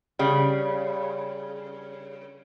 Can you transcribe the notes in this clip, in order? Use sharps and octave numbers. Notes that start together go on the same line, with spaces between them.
C#3 G3